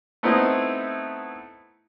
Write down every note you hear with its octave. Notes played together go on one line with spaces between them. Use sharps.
A3 B3 C4 D#4 E4